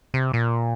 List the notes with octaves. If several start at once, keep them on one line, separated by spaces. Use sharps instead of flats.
C3
A#2